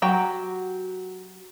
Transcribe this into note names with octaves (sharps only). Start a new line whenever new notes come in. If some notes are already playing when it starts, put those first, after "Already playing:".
F#3 F#4 G4 G5